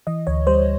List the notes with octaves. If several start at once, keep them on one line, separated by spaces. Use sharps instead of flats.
E3 D#5
D2 C#5
G3 C5